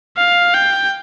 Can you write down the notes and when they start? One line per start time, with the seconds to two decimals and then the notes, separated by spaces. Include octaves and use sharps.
0.17 F5
0.54 G5